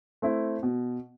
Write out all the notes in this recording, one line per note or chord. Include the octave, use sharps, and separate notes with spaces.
A3 C4 E4
B2